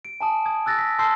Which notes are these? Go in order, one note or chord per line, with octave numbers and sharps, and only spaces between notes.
D7
G#5 A5 D#6
D#6 G#6
E6 F#6 A6 A#6
B6
A5 C6 E6 F6 G6 C7